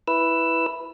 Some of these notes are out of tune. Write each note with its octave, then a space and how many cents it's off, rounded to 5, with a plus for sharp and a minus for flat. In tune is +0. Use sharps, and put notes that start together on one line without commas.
E4 +0 B4 +0 E6 +10